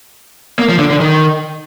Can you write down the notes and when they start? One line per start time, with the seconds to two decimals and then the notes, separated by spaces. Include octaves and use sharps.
0.59 A#3
0.69 F3
0.79 D3
0.90 D3
1.00 D#3